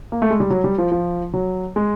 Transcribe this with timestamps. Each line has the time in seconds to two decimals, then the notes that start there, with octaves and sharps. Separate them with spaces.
0.12 A#3
0.22 A3
0.31 G#3
0.40 G3
0.50 F#3
0.64 G3
0.78 F3
0.92 F3
1.34 F#3
1.76 G#3